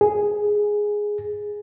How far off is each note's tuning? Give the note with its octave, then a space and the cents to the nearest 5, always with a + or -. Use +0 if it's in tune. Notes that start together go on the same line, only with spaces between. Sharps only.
G#4 +0